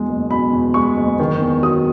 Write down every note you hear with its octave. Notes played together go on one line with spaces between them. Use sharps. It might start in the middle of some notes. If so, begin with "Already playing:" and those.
Already playing: E2 B2 G#3
F#1
B2 B5
E2
G#3 C#6
F#1
D#3
E2
F#3 D#6